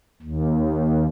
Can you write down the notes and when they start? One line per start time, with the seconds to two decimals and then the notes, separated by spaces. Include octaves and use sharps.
0.22 D#2